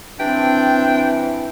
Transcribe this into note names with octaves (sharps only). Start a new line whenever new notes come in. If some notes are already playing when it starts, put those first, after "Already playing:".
E3 C4 D4 G5